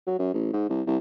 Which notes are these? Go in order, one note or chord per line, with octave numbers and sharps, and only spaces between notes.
F#3
F#2
A1
G#2
C2
C2